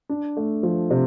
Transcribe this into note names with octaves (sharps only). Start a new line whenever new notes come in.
D4
A3
F3
C3